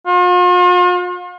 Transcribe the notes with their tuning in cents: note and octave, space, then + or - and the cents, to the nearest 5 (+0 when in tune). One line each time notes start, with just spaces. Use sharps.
F4 +45